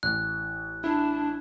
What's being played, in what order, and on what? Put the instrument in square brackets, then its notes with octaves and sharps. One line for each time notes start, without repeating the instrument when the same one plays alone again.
[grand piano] A1 [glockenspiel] F#6
[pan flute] D4 [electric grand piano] E4